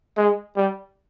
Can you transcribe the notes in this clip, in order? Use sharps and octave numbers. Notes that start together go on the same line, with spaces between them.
G#3
G3